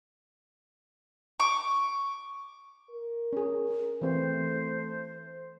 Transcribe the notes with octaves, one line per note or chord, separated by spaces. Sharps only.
C#6 D6
A#4
C#4 G#4
E3 A3 C4 C5